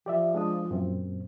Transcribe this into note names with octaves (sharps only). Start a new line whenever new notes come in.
F3 G4 D5 E5
G#3 D4 D#6
F#2 A#2 C4